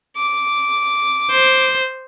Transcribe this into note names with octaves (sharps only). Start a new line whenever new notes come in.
D6
C5